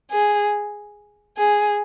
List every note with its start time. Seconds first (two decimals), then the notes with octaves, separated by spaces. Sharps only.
0.11 G#4
1.37 G#4